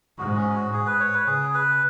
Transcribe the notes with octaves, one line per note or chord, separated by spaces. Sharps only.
G#2 F#4
C#4
F#4
G#2 G#4
B4
C#5
B4
C#3 G#4
B4